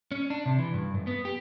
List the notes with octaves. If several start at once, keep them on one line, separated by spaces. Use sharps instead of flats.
C#4
D4
C3
E3
G2
F#2
B3
G4